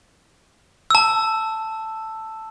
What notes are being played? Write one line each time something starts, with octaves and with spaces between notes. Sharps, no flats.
A5 E6